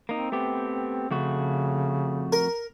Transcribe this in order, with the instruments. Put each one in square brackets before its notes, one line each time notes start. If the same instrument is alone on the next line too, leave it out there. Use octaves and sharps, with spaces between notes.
[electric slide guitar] A#3 D#4 [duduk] C4
[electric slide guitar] A3 B3 G4
[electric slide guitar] F2 A3 F#4 [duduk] C#3
[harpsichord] A#4